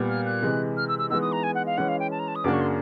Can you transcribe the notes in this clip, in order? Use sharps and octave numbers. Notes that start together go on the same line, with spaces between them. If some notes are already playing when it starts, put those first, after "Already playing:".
Already playing: A#2 G3 B3
F6
F#6
C3 E3 G#3
F6
E6
E6
E3 G#3 B3 D#4 E6
D#6
A#5
G#5
F#5
F5
E3 G#3 C#4 F#5
F5
G5
A5
A#5
A5
D#6
F#2 C#3 F#3 A#3 D4 D6
C#6
C6